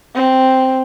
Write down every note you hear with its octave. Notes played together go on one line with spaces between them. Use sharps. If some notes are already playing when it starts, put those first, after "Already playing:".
C4